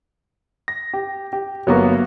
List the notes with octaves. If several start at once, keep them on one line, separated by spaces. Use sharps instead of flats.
A#6
G4
G4
G1 F#3 A#3 B3 F#4